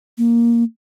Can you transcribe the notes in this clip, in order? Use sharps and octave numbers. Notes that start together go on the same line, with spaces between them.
A#3